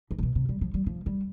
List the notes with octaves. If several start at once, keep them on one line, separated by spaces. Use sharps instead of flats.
G2
A2
B2
C3
G3
F3
G3
F3
G3